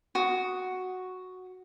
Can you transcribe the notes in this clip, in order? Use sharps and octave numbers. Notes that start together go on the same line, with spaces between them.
F#4 D#6